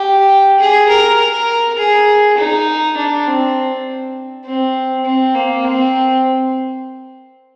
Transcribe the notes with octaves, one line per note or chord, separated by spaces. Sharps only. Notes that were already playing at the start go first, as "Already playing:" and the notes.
Already playing: G4
G#4
A#4
A#4
G#4
D#4
D4
C4
C4
C4
A#3
C4